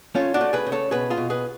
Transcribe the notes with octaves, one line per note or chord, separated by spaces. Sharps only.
A3 C#4 F4
D4 F#4
A3
G#4 B4
C#3
A4 C#5
B2 G#4 B4
F4 G#4
B2
G#4 B4